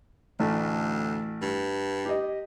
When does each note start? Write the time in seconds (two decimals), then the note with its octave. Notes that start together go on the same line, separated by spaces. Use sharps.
0.40 A1 D2 A3
1.42 G2
2.05 G4 D#5